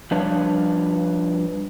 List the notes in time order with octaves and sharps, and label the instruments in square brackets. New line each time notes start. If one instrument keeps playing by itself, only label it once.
[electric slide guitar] F3 G3 D4 B4 C#5 F5